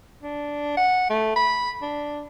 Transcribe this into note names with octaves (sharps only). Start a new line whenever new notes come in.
D4
F#5
A3
B5
D4